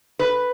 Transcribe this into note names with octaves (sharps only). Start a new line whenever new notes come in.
B4